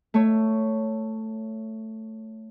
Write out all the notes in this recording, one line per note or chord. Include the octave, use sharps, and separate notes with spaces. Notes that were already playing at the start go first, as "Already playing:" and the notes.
A3 C#5